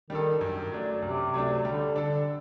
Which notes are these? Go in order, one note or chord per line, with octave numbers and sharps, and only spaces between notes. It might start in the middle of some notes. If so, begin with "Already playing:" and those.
D#3 G3 D4 A4
F#2
F#3 A3 D4
F#2 C3
F#3 A3 D4
D3 G3
D4 A4